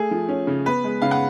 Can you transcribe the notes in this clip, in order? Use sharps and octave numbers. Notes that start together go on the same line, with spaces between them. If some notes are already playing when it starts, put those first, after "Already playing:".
Already playing: A3 G#4
F3
C#4
C#3
B3 B4
G#3
C#3 F5
F#5